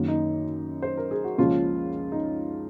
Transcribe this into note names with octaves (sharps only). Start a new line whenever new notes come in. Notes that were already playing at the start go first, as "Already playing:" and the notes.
Already playing: F#2 D#3 A#3
D#4
C5
A#4
G#4
F#4
C#2 C#3 F3 A#3 C#4 F4
D#4